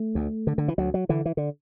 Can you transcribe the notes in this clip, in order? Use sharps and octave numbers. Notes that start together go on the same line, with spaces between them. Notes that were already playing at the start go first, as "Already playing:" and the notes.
Already playing: A3
D2
D3
D3
E3
D2 F#3
F#3
D3 E3
E3
D3